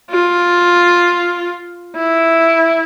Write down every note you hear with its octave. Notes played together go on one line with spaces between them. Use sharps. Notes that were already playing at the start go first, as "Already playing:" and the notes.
F4
E4